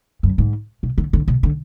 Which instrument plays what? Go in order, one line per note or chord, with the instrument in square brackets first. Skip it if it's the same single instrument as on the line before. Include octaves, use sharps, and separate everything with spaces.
[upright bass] F#2
G#2
B2
D3
D3
B2
D3